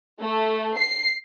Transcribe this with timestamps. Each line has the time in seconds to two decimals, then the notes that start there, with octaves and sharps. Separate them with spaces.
0.21 A3
0.78 C7